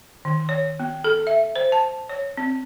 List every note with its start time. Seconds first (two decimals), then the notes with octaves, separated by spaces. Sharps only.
0.25 D#3
0.49 C#5
0.80 B3
1.04 A4
1.27 E5
1.56 C5
1.72 A5
2.09 C#5
2.37 C4